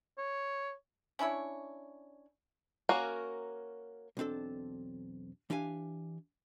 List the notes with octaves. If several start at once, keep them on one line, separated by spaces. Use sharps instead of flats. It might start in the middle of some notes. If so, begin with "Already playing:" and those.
C#5
C#4 D4 E4 C#5
A#3 C#4 F#4 A#4
B1 E2 C4 D4 A4
E3 D4 G4 F5 G#5